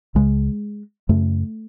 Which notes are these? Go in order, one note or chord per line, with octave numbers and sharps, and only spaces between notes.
C#2 C#3 G#3
F#2 C#3 A3